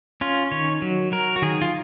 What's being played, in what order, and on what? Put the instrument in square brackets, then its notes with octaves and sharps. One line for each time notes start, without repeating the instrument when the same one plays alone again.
[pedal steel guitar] C#4 F4
D#3 C#5
F#3
F#3 A#4
F#4
D#3 G#4
F4